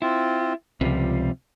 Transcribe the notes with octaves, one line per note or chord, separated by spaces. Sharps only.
C4 E4 F4
C#2 C3 F3 G3